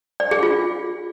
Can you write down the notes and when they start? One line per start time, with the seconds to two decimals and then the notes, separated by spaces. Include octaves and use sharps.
0.20 D5
0.31 G#4
0.43 F4